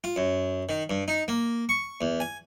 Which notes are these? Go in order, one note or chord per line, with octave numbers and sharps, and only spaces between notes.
F4
F#2
D#3
G2
D#4
A#3
C#6
E2
G#5